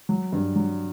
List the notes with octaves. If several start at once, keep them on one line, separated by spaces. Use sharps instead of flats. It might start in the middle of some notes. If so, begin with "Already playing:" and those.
F#3
G2
F#3